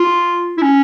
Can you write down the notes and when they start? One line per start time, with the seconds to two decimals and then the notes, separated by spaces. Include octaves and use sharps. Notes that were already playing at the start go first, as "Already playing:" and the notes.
Already playing: F4
0.58 E4
0.62 C#4